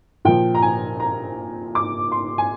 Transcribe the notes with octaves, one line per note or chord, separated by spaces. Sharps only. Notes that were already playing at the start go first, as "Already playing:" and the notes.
A#2 F3 G5
A#5
G#5
A#5
D6
C6
G#5